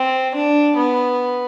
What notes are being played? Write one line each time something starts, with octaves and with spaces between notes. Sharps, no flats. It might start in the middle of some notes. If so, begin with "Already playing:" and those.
Already playing: C4
D4
B3